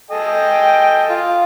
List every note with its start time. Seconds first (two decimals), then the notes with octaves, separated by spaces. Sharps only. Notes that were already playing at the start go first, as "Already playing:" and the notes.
0.11 A4 D#5 G5 G#5
1.09 F4